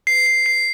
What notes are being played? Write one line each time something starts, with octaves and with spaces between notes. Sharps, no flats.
C7
C7
C7